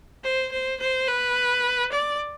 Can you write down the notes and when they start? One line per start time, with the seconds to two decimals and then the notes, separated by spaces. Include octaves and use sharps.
0.24 C5
0.52 C5
0.80 C5
1.08 B4
1.92 D5